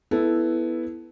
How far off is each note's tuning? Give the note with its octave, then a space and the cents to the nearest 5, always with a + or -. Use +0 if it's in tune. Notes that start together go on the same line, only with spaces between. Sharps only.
B3 +0 E4 +0 A4 -10